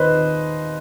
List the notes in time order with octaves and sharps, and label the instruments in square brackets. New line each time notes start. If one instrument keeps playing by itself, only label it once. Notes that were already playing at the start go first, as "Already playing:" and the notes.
Already playing: [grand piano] D#2 D#3 B4 C5 D#5